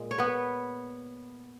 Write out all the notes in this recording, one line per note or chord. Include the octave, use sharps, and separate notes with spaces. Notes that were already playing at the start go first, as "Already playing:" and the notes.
Already playing: A#2 G#3
C#5
B3 B4